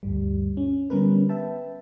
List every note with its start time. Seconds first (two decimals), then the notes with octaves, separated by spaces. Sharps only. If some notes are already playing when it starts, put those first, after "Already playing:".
0.03 D2 G2 G3
0.57 C#4
0.90 D3 G3 B3 C#4 A#4 B4
1.29 B4 E5 G5 A5